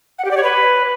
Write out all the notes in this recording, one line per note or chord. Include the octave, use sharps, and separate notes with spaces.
F#5
G4
D5
C#5
B4